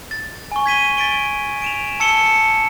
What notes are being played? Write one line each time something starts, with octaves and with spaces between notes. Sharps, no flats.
A6
G#5 C#6
G#6 B6 D#7 G7
A6 B6 D7 G7
D7 E7 F7
A5 E6 C#7 E7 G7